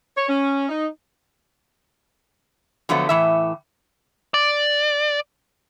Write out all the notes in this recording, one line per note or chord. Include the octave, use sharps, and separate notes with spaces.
C#5
C#4
D#4
D3 F3 F#3 A3 B3
A2 E3 E5
D5